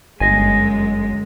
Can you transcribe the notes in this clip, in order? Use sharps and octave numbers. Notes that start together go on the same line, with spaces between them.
G1 F#2 G#3 D#5 G#5